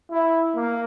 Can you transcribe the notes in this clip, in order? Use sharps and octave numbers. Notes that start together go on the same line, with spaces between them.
E4
A#3